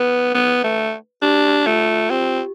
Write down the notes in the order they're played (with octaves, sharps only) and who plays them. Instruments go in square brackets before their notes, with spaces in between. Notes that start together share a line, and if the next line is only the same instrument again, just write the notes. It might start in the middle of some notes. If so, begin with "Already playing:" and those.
Already playing: [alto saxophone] B3 [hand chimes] B4
[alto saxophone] B3
A3
[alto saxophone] D4 [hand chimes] G4
[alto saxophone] A3 [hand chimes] F4
[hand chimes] F4
[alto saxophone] C4 [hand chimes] G4